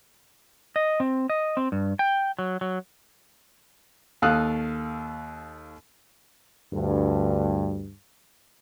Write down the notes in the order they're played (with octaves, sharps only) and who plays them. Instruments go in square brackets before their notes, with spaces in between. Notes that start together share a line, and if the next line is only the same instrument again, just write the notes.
[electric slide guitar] D#5
C4
D#5
C4
G2
G5
F#3
F#3
[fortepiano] D#2 A4 F5 D#6 F#6
[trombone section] D2 G2